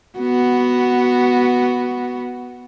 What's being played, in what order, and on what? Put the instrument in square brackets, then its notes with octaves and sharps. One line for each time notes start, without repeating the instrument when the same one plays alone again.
[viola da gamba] B3 F#4